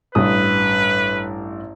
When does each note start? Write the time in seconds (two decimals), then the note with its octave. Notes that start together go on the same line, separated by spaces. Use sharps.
0.15 A1 G2 B4 D#6